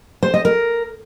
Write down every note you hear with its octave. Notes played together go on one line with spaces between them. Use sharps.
C5
D#5
A#4